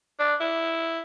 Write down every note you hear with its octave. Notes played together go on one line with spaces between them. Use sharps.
D4
E4